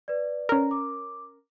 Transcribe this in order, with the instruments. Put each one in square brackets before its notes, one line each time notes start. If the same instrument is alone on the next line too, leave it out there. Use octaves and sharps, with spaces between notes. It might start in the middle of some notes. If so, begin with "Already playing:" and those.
[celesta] B4 D5
[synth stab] C#4 A#4
[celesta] D6